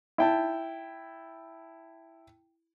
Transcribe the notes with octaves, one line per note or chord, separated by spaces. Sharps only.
E4 G5 A5